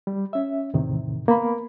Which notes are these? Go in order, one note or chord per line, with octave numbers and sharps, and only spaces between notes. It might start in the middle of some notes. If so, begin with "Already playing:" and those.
G3
C#4 E5
E2 A2 C3 D#3
A#3 B3 B5